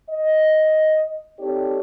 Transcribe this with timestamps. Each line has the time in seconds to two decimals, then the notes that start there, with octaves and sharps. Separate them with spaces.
0.10 D#5
1.39 C4 D#4 G4 A4 C#5 D5